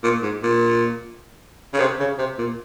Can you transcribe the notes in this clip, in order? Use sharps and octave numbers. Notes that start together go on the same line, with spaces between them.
A#2
G#2
A#2
C#3
C3
C#3
C3
A#2